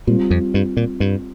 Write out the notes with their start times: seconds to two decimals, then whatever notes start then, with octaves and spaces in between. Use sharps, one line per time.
0.07 A#2 G3 C4 F4
0.31 F2
0.54 G2
0.77 A#2
1.00 G2